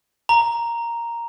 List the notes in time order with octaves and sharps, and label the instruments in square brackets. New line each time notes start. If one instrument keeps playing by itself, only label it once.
[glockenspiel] A#5